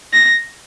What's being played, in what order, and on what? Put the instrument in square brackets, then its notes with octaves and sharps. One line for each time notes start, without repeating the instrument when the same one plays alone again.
[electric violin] A#6